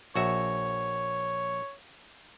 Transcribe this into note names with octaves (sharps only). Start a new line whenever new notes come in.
A#1 F#4 C#5 E5